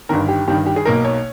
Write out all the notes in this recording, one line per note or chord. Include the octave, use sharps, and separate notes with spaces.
G1 G2 D#3 A#4
G4
G1 G2 D#3 G4
G4
G#4
B1 B2 A#3 D#4 A#4
C#5